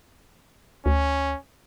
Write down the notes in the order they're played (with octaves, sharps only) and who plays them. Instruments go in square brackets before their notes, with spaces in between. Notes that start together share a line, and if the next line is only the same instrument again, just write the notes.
[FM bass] D2 [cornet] C#4